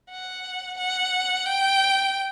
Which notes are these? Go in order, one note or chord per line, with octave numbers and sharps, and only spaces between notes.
F#5
F#5
G5